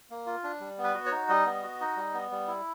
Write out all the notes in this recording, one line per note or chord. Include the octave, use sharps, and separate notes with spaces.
A#3
F4
D4
G3
B3
B4
F#4
C#5
D#4
G3 D#5
B3
F#4
D#4
G3
B3
G3
E4